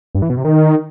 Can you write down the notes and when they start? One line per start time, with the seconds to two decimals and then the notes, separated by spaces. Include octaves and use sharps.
0.15 G2
0.22 E3
0.30 B2
0.37 C3
0.45 D#3